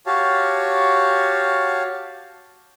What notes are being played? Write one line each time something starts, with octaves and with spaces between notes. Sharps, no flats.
F#4 G4 C#5 F5 A5